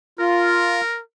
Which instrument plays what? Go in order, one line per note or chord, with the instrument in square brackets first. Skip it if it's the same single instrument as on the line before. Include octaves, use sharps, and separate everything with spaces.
[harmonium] F4 [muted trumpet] A#4